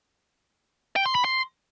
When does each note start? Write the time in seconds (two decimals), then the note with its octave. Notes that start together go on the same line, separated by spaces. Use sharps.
0.96 G5
1.06 C6
1.15 B5
1.25 C6